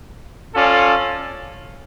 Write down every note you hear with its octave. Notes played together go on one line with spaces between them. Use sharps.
C#4 F4 A4 D5 F5